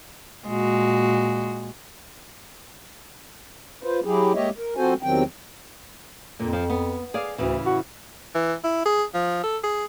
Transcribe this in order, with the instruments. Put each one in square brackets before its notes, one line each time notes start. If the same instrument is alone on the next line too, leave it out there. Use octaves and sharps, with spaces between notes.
[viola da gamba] A#2 G#3 F#4
[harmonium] F4 B4 C5
F#3 E4 G4 G#4
G#3 A#3 G4 C#5 D#5 E5
A#4
F3 C4 F#4 A4 C5 G#5
E2 C3 D#3 F#3 C4 G5
[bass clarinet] F2 [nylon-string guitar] A#2 D3
[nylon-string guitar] F3
B3
G#4 D5 F5
[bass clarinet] D2 [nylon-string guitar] A2 C#3 E3
[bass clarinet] F#4
[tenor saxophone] E3
E4
G#4
F3
A4
G#4